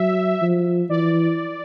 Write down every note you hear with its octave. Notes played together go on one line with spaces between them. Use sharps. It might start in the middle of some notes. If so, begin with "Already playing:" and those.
Already playing: F#3 E5
F3
E3 D5